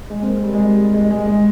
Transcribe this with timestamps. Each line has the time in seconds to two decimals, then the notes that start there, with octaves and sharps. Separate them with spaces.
0.10 G#3
0.22 C4
0.27 A#3
0.44 G3
0.53 G#3
0.60 G3
0.77 G3
0.94 G#3
1.10 G#3
1.27 G#3